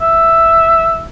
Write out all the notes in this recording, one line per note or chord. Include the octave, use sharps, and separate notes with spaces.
E5